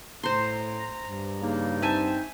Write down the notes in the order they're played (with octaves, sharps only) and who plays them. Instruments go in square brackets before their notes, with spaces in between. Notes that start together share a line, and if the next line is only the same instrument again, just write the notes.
[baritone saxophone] A2 [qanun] C5 C6 [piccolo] A#5
[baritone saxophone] G2
[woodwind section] C#3 A#3 D#4
[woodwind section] C4 D4 D#4 [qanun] E5 G#5 [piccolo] A5